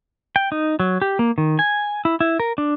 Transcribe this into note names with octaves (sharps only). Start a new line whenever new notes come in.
G5
D#4
F#3
G4
A#3
D#3
G#5
E4
E4
A#4
D4